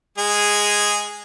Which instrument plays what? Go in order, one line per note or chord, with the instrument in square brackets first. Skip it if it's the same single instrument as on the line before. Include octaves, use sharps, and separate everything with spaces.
[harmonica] G#3 G#4